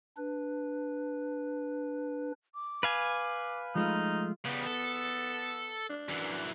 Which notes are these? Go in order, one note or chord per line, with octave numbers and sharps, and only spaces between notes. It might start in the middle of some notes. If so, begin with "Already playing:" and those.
D4 B4
D6
B4 F5 G#5
F3 G#3 A3 D#4 F4
C#3 G3 B3
A4
D4
F#2 E3